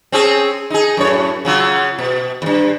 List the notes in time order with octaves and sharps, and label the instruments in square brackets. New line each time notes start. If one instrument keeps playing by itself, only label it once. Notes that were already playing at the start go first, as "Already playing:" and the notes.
[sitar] C4 C#4 G#4
D#4 G#4
F#2 A2 C#5
C#3 F#3 F4
B2
E2 G2